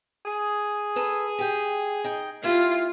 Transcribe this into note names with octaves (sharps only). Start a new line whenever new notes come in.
G#4
A4 B4
G4 G5
D#4 G5
A#3 E4 F4 G4